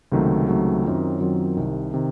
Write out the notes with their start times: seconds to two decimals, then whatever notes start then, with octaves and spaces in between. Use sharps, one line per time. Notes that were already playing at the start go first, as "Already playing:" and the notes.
0.12 C#2 C3 D#3 F#3 A3
0.48 C#2 C3 D#3 F#3 A3
0.84 F#2 D#3 F#3 C4 F4
1.21 F#2 D#3 F#3 C4 F4
1.57 C2 C3 D#3
1.94 C3 D#3